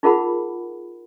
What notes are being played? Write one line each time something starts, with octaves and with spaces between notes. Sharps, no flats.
D#4 F4 G#4 A#4 F#5 B5